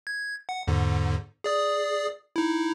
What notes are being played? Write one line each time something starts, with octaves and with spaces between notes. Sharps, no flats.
G#6
F#5
E2 G#2 D3
G#4 D5 D#6
D#4 E4